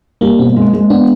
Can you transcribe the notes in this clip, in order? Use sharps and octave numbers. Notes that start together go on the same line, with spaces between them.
G3 A#3
B2 C4
G#3
G#3
B3 D4